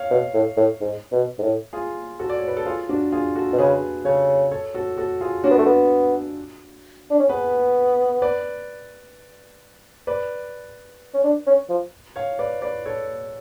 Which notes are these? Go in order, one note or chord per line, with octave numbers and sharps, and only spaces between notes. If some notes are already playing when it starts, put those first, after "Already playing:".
Already playing: C#5 F5
B2
A2
A2
G#2
B2
G#2
A2
F4 G#4
F#4 A4
D5
C#5
B4
A4
F4 G#4
D4 F#4
F4 G#4
F#4 A4
B2
C#3 G#4 B4
C#3 A4 C#5
A4 C#5
F#4 A4
F#4 A4
F4 G#4
C#4 D4 F#4
B3
A3
B3
D4
C#4
B3 G#4 B4
B4 D5
B4 D5
C#4
D4
C#4
F3
C#5 F5
B4 D5
B4 D5
A4 C#5